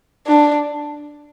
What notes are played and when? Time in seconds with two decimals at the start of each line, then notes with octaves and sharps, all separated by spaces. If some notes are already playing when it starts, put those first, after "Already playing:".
0.27 D4